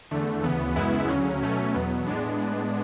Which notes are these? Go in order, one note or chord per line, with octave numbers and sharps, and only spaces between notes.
E2 D3 A3
D2 C#3 E3 B3
F#2 C#3 G#3 B3 E4
D2 C#3 F#3 C#4
B2 F#3 A3 C#4
E2 B2 F#3 B3
A2 G#3 B3 D4